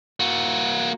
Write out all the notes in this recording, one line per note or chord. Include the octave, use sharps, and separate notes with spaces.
A#3 F#4